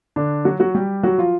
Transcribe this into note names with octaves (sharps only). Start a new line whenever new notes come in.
D3 D4
F#3 F#4
F#3 F#4
G3 G4
F#3 F#4
F3 F4